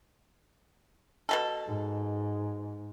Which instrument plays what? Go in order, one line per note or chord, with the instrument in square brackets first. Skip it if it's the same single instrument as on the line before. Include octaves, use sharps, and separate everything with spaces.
[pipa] B2 G3 A4
[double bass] G#2